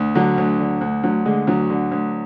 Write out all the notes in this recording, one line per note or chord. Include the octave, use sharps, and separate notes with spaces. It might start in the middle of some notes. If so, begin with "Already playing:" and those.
Already playing: D2
D3 F#3
D2
D3
D2
D2 F#3
D3 G#3
D2 F#3
D3
D2